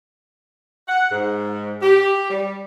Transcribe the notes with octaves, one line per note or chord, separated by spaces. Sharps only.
F#5
G#2
G4
G3